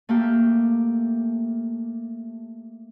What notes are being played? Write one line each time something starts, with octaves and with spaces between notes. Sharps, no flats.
A3 A#3 G4